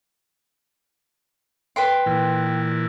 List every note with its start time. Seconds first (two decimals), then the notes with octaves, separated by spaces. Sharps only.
1.76 B4 G5 C6
2.06 A#2 E3